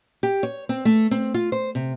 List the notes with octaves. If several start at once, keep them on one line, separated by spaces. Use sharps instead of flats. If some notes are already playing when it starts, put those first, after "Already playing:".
G4
C#5
C4
A3
C4
F4
C5
C3